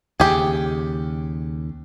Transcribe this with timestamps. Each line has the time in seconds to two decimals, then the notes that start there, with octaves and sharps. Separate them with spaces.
0.20 D#2 C#3 G4 G#4